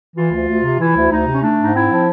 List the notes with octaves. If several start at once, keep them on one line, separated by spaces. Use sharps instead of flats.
E3 F4
D2
D2
C3
E3 E4
D2
D2 D#4
C3
C#4
A3 D4
G#2 D#4
C4 E4
F3